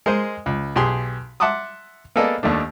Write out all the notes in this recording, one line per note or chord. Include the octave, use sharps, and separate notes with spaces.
G#3 A#4 C5 D#5
C#2
B1 G4 G#4 C6
E5 F#5 A5 C6 D6 D#6
A#3 B3 G#4 A4 D5 D#5
D#2 D#3 A3 D4